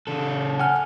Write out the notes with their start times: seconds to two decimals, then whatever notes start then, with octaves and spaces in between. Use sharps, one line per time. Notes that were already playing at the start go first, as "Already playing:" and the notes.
0.07 C#3 A4
0.60 F#5 G#5 F6